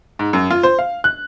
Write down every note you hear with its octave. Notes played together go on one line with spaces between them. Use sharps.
G#2
F#2
F4
C5
F5
F#6